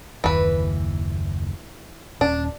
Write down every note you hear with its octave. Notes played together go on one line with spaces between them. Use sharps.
F#1 D#2 E3 B4
D#1 C#4 D4